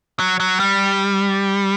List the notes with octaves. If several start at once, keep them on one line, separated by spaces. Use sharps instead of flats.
F#3
F#3
G3